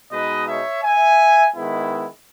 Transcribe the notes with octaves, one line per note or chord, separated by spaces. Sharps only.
B2 G#3 D#4 B4 D#5
C#5 E5
E5 G#5
D#3 G#3 B3 E4